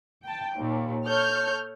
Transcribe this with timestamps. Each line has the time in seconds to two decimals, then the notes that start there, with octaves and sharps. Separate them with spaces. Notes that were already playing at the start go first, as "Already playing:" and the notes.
0.24 G5 A5
0.56 D#2 A#2
1.06 A4 C#5 F6 G6